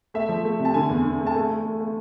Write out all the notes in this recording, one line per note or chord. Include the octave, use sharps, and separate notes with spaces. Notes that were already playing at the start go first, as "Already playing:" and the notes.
A3 E5
F3
A3
C3
A5
D3 G#5
E2
D3
A3
A5
A3 G#5
A3
A3
A3